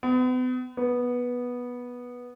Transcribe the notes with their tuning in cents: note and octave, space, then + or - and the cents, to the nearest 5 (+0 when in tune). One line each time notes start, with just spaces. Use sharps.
B3 +40
B3 -10